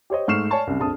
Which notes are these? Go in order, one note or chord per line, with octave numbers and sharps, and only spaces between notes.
G4 C5 C#5 D#5
G#2 A3 C#6 F6 C7 E7
C#5 D5 G#5 A5 C#6
C2 F#2
A#1 F2 A5 D#6